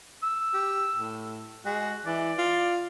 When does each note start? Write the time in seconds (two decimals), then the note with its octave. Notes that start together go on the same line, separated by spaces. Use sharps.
0.23 E6
0.54 G4
0.97 A2
1.65 G#3 F#4
2.06 E3 D5
2.38 F4